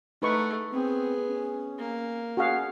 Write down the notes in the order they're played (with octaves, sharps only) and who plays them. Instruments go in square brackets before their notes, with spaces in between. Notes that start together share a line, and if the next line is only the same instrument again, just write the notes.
[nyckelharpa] A3 [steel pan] D#4 B4 C#6
[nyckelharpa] B3 G#4 [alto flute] C4
[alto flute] C#4
[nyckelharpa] A#3
[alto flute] C#4 [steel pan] F#4 G#4 F5